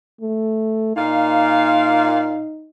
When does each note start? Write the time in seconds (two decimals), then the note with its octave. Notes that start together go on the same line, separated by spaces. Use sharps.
0.21 A3
0.97 A#2 D#4 F5